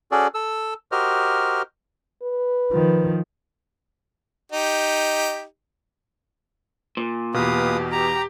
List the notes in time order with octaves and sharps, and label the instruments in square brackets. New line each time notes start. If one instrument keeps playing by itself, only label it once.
[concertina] C#4 F#4 G#4 A4 D5
A4 E6
F#4 G4 A#4 C5 D#5 F6
[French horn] B4
[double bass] D#3 F3
[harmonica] D#4 G4
[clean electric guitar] A#2
[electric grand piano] E2 B2 [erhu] G4 [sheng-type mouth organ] B4 F5 D#6
[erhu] G4 [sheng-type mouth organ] A#5